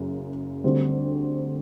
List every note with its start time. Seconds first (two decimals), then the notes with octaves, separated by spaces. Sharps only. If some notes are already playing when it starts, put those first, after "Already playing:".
Already playing: F#1 F#2 C#3
0.64 D2 D3 G3 C4